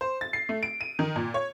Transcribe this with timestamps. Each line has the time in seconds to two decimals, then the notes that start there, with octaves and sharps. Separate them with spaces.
0.01 C5
0.21 A6
0.33 C7
0.49 A3
0.63 D7
0.81 D#7
0.99 D#3
1.16 A#2
1.34 C#5